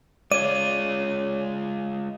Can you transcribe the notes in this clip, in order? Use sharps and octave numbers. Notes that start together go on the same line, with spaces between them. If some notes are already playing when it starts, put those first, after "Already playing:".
G#3 F4 C#5 D5 D#7